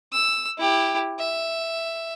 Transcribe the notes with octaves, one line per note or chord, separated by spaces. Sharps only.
E6
E4 G4
E5